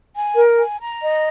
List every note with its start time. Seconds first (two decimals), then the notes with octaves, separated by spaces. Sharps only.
0.14 G#5
0.35 A#4
0.57 G#5
0.79 A#5
1.01 D#5